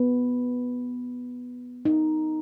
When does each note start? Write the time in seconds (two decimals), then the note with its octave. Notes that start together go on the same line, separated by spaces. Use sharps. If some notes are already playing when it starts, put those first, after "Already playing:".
Already playing: B3
1.85 D#4